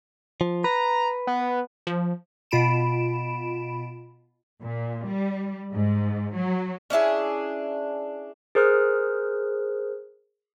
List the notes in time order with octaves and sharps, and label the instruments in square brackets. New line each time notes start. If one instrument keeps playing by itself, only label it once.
[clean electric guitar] F3
[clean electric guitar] B4 [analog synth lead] A#5
[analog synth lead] B3
[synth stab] F3
[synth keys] B2 F4 B5 D7 E7
[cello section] A#2
G3
G#2
F#3
[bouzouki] C#4 D4 E4 G#4
[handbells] G#4 A#4 C5 D#6 F6 F#6